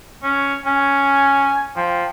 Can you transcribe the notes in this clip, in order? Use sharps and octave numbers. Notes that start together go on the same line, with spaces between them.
C#4
C#4 G#5
F3 G5